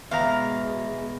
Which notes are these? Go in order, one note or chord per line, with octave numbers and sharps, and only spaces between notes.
E2 B2 G#3 E5 F5 A#5